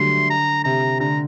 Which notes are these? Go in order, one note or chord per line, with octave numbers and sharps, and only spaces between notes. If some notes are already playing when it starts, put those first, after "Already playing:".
Already playing: D3 F#3 G3 A3 C6
A#5
C3 A#5
D3 A#5